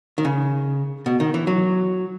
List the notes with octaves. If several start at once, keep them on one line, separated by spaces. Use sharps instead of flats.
D#3
C#3
B2
D#3
E3
F#3